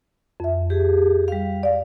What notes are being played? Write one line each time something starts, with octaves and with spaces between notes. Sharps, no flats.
F2 E5
G4 G#4
G3 F5
D5 F5